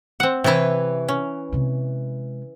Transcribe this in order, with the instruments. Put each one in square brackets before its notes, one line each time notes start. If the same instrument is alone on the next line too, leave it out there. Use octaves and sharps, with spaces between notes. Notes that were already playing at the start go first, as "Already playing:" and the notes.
[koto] C4 F#5
[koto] C3 E4 [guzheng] E3 B4 C#5
[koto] C#4
[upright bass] C3 G#3